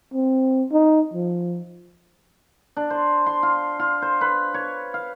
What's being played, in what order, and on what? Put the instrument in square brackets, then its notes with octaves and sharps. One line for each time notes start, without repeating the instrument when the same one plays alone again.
[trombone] C4
D#4
F3
[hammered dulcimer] D4
C5
C6
F4
F4
C5
B4
C#5
F5